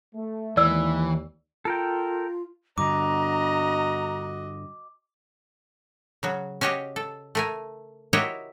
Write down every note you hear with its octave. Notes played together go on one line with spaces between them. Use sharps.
A3
D#2 E3 D5 E6
F4 A4 A#4 G5
G2 D3 F#4 D#5 A#5 D6
C#3 F#3 F#4
C#4 F#4 G4 C#5 D#5 G5
A4
A3 A#4 G#5
E4 F#4 G4 A#4 C#5 D#5